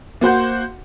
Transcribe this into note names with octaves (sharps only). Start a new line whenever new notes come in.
A#3 F#4 C5 F#5